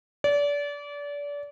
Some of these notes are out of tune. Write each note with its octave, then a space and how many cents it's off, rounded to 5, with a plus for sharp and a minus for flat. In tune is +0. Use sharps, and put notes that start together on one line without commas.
D5 -30